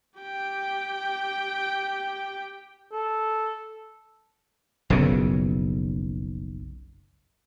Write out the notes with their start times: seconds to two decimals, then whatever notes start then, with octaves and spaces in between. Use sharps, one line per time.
0.20 G4 G5
2.92 A4
4.90 F#1 B1 F2 C#3